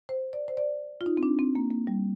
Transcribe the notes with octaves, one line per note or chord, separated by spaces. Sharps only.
C5
D5
C5
D5
F4
D#4
C4
D4
C4
A#3
A#3
G3